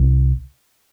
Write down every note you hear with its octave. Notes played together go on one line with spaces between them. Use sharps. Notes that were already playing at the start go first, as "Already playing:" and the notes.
Already playing: C2